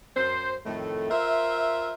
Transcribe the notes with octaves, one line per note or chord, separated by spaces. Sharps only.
F#2 C5
F2 A2 D#3 A3
F4 A#4 C5 E5